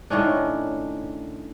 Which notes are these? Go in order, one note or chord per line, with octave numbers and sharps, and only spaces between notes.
A2 D#3 C#4 D4